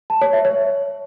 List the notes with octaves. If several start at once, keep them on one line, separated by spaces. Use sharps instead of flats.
A5
C#5
E5
C#5